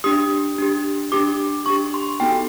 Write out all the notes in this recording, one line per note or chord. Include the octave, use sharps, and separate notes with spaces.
D4 G4 D#6
D4 G4
D4 G4 D6
D4 G4 C#6
C6
B3 D#4 F#4 A4 G5